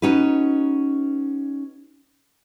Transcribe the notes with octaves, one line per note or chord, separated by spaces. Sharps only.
C#4 D#4 F#4 B4